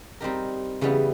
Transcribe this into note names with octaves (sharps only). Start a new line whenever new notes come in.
G3 C4 D#4 G4 A#4
C#3 E3 G3 B3